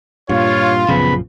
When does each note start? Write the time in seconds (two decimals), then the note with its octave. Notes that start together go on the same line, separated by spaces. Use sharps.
0.29 G2 A#2 F4 C#5
0.89 A#1 F#2 C#3 F3 B3 B5